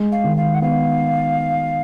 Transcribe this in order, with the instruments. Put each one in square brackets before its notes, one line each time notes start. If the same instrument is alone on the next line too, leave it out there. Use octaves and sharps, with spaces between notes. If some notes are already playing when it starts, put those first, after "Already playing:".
Already playing: [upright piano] G#3
[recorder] F5
[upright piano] D#3
[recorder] F5
F#5
[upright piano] B3 [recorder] F5